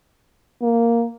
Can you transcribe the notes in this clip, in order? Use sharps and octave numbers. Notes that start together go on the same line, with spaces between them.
A#3